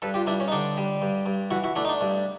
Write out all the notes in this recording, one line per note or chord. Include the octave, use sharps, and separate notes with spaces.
G2 A4 B4
F4 G4
G2 D4 E4
C#4
D#4
D3 D4
G3
G2
G2
E3 E4 F#4
E4 F#4
A3 D4 E4
D#4
D4
G2